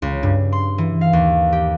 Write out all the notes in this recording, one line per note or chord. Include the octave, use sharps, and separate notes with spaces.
C#2
G2
C6
E3
F5
D#2
G4